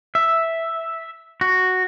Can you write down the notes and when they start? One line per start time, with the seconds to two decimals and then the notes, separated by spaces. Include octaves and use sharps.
0.15 E5
1.41 F#4